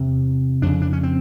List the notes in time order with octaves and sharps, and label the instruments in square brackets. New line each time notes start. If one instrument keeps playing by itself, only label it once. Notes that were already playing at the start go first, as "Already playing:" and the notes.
Already playing: [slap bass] E2 C3
F2 C#3 D4
D4
C#4
C4